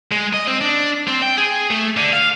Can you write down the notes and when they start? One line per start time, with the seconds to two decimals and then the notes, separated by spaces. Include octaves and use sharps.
0.12 G#3
0.34 D#5
0.47 C4
0.61 D4
1.08 C4
1.22 G5
1.37 G#4
1.70 A3
1.97 D3
2.13 F5